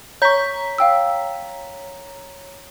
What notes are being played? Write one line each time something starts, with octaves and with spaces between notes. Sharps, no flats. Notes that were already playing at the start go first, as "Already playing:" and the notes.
C#5 A#5 C#6 G6 B6
F5 G5 E6